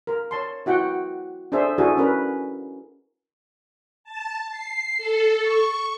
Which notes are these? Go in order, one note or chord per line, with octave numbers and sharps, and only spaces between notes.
A#4
C#5 A5 C6
E4 F#4 F#5 G5
D4 G#4 A4 C5 E5
D4 E4 F#4 G#4 A4
C#4 A#4 B4
A5
C7
A4
C#6